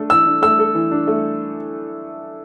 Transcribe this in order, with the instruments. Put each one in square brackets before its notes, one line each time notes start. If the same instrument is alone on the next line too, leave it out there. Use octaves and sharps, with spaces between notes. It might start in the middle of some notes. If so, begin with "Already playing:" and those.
Already playing: [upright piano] A3 D4 A4
[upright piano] E3 [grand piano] E6
[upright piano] D4
[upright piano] A3 [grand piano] E6
[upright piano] A4
E3
D4
A3